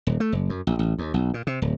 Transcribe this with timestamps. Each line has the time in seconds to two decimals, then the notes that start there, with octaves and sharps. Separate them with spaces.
0.07 D#1
0.20 A3
0.32 F#1
0.49 F#2
0.67 A#1
0.79 A1
0.98 D#2
1.14 B1
1.34 A#2
1.47 C3
1.62 D1